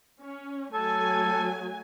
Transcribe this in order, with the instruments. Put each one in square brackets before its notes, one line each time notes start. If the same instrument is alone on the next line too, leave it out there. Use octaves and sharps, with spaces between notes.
[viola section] C#4
[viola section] F#3 A3 G#5 [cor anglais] A4